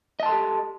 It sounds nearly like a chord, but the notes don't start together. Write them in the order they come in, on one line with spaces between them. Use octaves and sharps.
D#5 A5 C6 A4 G4